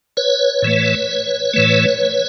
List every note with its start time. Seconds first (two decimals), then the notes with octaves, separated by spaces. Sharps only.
0.17 B4 C#5
0.62 A2 E3 A3
1.54 A2 E3 A3